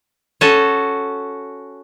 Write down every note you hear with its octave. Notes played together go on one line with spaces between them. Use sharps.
C#4 F#4 A4